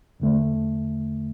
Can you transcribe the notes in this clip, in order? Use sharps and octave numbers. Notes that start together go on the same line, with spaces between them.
E2 D3 A3